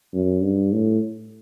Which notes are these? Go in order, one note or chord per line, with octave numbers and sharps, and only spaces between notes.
F#2
G2
A2